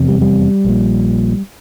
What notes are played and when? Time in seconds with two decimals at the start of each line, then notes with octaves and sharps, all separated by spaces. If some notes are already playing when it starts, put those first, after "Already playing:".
Already playing: F1 E2 C3
0.08 G3
0.21 G3
0.65 A#1 A#2